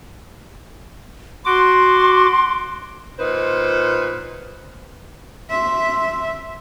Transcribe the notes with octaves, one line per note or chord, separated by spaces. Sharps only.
F#4 C6 D6
A#2 D#4 B4 C5
E5 C6